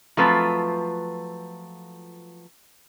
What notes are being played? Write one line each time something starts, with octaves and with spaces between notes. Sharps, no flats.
F3 F#3 A3 C4 F4 B4